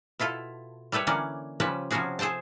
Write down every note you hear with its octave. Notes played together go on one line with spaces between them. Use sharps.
B2 E4 F4 A4
G3 A3 A4 B4 C#5
D3 E3 A#3 C#4 D5
C#3 F3 G3 C#4 B4 A5
C3 F3 B3 C#4 F#4 G#4
G#4 A4 C5 G5 A5